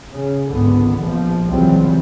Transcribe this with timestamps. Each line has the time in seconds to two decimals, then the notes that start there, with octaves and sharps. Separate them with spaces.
0.13 C#3
0.49 G#1 C#2 D3 B3
1.00 A#1 F3
1.46 C#2 C3 E3 F#3 G3 C4